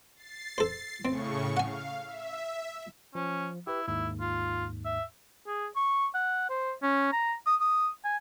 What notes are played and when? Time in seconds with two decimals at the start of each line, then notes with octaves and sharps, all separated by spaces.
0.16 A6 C7
0.58 A4 C5
1.05 A2 C#3 C4 C#6
1.57 F5 F#5 G#5
2.05 E5
3.15 F3 C#4
3.67 E4 G4 B4
3.88 D#2 G#2 E4
4.21 F4
4.85 E5
5.47 G#4
5.76 C#6
6.14 F#5
6.50 C5
6.82 C#4
7.12 A#5
7.46 D#6
7.60 D#6
8.04 G#5